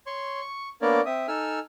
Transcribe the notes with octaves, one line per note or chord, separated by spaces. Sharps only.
C#5 C6 C#6
C#6
A#3 B3 D4 A#4 C#5 D5
C4 E5 D#6
D#4 A4 G#5 E6 F6